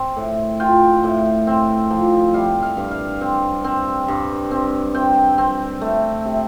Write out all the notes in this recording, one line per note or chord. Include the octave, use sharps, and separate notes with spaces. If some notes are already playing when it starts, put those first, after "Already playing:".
Already playing: C4
A2
F4 G5
A2
C4
F3
G3 F5
F5
G2
F5
C4
C4
G2
C4
C4 G5
C4
A3
C3